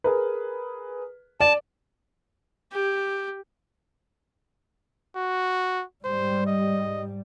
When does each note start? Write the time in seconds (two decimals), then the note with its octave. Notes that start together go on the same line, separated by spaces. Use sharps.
0.04 G#4 A#4 B4
1.40 D5 A5
2.72 G4
5.16 F#4
6.04 G#2 G3 C5
6.47 D#5